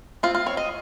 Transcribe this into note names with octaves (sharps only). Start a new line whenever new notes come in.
C4 F4
F4
C4 C#5
D#5